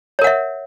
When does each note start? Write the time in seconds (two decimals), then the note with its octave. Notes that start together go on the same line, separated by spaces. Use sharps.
0.19 C#5
0.21 A#4
0.24 F#5
0.27 E5